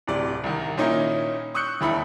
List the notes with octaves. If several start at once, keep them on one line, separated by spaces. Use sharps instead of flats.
D1 C3 D5
C2 D#3
A#2 D#3 C#4 D#4 E4
C#6 D#6 E6 F#6 G6 C#7
E1 D#2 E4 B5